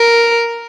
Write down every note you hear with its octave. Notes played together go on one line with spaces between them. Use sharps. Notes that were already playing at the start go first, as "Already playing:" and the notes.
Already playing: A#4